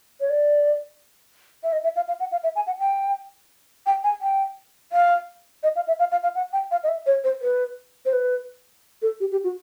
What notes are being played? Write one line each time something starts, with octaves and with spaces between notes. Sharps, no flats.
C#5
D5
E5
D#5
E5
F5
F5
F#5
F5
E5
G#5
F#5
G5
G5
G#5
G5
F5
D#5
F5
E5
F5
F5
F5
F#5
G5
F5
D#5
E5
C#5
C5
B4
C5
B4
A4
G4
G4
F#4